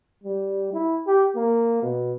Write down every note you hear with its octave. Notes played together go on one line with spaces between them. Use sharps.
G3
E4
G4
A#3
B2